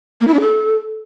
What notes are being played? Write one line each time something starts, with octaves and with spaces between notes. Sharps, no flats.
A#3
E4
D4
A4